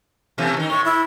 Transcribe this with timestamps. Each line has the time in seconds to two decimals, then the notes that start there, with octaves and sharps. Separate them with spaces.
0.38 B2 E3 A3
0.57 D#3 D#4
0.70 A2 C#6
0.85 E4